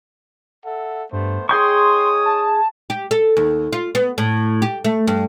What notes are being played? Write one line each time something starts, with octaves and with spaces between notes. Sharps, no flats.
A4 E5 F#5
G2 A3 B3 C5
D#4 G#4 C#5 G5 C6 C#6 D#6
A5
G4
A4
D#2
F4
B3
A2
G4
A3
G2